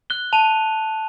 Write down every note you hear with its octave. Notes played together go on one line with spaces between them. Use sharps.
F#6 G7
A5 D#7 F7